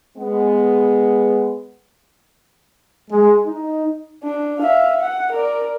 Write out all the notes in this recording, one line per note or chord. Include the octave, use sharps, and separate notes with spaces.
G#3 B3
G#3
D#4
D4
E5 F5
F#5
A#4 D5